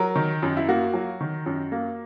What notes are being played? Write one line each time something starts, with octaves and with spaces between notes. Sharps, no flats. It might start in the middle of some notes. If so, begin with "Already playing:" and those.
Already playing: F#3 A#4
D#3
F#2
E4
A#3 F#4
F#3
D#3
F#2
A#3